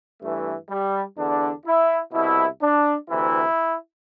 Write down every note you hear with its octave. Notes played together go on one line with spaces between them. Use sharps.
G2 E3 A3
G3
E2 D3 D4
E4
C2 B2 E4
D4
D2 C3 E3 E4